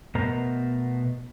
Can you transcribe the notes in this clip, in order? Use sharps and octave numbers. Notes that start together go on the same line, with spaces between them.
B2 A3 B3 A#4 C5 A#5